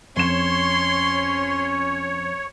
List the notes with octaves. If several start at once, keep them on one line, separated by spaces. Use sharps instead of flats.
F2 C#4 C#5 C6 E7